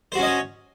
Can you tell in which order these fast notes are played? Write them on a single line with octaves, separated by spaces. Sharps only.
C5 F#4 C#4 D#5 C#5